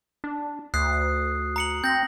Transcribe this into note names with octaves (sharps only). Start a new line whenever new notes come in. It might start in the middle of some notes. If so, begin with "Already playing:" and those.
D4
D2 D#6 F#6 C7
A#5 C#7 F#7
C4 G6 A#6 F#7